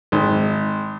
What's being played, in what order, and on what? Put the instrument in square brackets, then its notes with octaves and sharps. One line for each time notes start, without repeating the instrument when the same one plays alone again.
[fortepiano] G#1